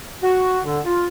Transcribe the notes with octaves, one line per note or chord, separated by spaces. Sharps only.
F#4
D3
F4